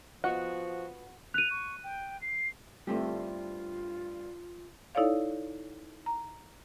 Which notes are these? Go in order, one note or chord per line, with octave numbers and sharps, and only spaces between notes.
F3 B3 F4 F#4 D#5 F#5
F#6 D#7 F7
C#6
G5
C7
G2 G3 A3 C4 F4 G4
D#4 E4 A4 C#5 D5 F5
A#5